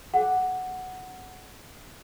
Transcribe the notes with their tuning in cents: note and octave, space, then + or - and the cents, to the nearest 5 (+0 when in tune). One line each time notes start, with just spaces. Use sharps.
G#4 +45 F#5 +0